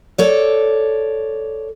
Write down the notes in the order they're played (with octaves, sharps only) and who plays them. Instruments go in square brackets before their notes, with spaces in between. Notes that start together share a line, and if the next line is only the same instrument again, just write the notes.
[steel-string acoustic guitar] A4 C#5 D5